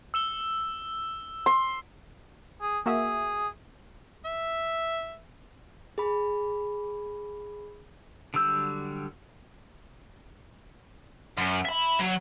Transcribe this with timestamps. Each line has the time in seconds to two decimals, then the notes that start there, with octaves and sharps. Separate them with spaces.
0.14 E6 E7 G7
1.46 C6
2.61 G#4
2.86 A#3 F#4 G#4 E5
4.25 E5
5.98 G#4 B5
8.34 D3 F#3 G3 E6 G6
11.37 F#2
11.65 E5 B5
11.99 F#3